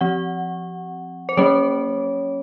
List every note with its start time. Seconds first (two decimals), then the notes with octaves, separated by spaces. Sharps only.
0.01 F3 C4 F#5
1.29 C5
1.37 F#3 A#3 C#4 C#5